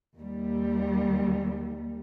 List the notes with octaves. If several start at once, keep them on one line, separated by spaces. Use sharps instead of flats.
D#2 G3